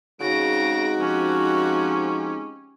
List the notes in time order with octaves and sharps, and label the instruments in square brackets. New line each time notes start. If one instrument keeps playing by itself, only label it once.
[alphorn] C#3 [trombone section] G#3 C4 D#4 [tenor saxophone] F#4 [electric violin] A#6 D7
[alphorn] F3 [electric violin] C#4 G4